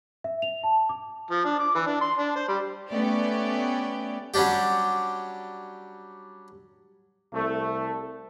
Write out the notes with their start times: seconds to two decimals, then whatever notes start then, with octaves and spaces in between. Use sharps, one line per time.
0.24 E5
0.42 F7
0.63 A5
0.89 D6
1.31 F3
1.45 D4
1.59 D6
1.75 E3
1.86 D4
2.01 C6
2.18 D4
2.36 C5
2.48 G3
2.91 A3 B3 C#4 G4 D5
4.34 F#3 G3 C#4 D4 G4
7.33 C2 A3